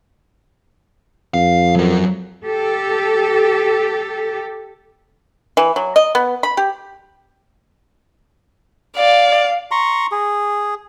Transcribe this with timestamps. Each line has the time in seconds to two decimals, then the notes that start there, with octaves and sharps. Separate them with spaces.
1.34 F2 F5
1.76 F#3 A#4
2.44 G4 A4
5.57 E3
5.76 F#3
5.96 D#5
6.15 B3
6.43 B5
6.57 G4
8.97 D5 F5
9.71 A#5 C6 C#6
10.12 G#4